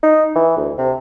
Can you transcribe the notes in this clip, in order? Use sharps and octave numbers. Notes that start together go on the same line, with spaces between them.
D#4
E3
D2
C3